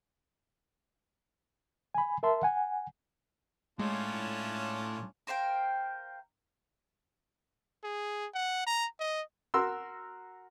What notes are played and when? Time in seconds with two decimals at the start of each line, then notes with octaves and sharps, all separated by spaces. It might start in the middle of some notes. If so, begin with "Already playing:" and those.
1.95 G#5 B5
2.23 A#4 E5 A5 C6
2.43 F#5 G#5
3.79 A2 G#3 C#4 D4 F4
5.27 A#4 C5 F5 G5
7.83 G#4
8.34 F#5
8.66 A#5
8.99 D#5
9.54 F#4 A#4 C6 E6